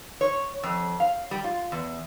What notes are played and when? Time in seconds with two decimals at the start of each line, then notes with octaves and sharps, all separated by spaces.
0.21 C#5
0.63 F2
1.00 F5
1.31 G3
1.44 F4
1.72 E2